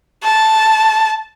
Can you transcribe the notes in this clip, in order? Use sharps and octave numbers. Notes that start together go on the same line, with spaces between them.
A5